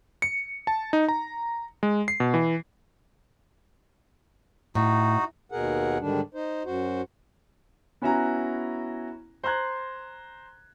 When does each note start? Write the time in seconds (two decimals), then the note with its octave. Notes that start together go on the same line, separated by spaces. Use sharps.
0.22 C#7
0.67 A5
0.93 D#4
1.09 A#5
1.83 G#3
2.08 C7
2.20 B2
2.34 E3
4.75 A2 D#4 F#4
5.52 D#2 B2 G#4 A#4 F#5
6.00 G#2 D3 D#3 G3 D4
6.34 D#4 C5
6.65 F#2 F#4 C5
8.02 B3 C#4 E4 F#4 G#5 A#5
9.44 C5 A#5 C6 F#6 G#6